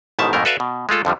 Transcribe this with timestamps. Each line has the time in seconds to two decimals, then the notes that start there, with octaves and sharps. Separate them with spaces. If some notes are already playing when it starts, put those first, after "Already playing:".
0.19 A1 G#2 B2 D#3 E5 A5
0.33 F2 G#2 B2 A3 A#3 A#4
0.45 F#4 A4 B4 D5 E5 F5
0.60 B2
0.89 G#3 A3 F4 A4
1.05 F2 D3 F3 G3